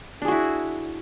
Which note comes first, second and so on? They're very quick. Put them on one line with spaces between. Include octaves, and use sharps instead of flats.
D4 G#4 F#4 E4